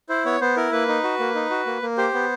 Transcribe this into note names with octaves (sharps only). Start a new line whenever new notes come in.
E4 C5
B3 C#5
B3 C5
E4 A#4
A#3 B4
D#4
F#4
A#3
D#4
F#4
A#3
A#3
G4 C5
B3